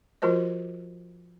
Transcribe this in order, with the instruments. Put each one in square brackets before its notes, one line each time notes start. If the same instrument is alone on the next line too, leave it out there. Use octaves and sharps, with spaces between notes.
[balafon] F3 F4 F#4 A#4 C5 D#5